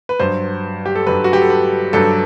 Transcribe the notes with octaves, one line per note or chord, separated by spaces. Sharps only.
B4
G2 F#3 C5
G4
A4
G2 F#3 B4
F#4
G4
A4
B4
G2 F#3 A4